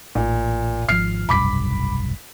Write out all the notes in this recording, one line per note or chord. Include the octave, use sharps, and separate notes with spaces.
A1 A#2
G#1 C3 F3 F6 C7
F1 B1 G2 B5 D6 B6